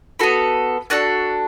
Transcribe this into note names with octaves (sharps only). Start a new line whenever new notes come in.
B3 F#4 A4 B5
D4 F#4 A4 F#6